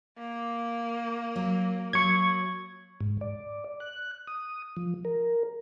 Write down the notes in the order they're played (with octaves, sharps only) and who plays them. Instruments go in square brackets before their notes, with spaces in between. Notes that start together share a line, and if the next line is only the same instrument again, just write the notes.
[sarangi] A#3
[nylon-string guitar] F#3
[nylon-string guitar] F#3 [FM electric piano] C#6 G#6
[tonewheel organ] G#2
D5
F#6
D#6
F3
A#4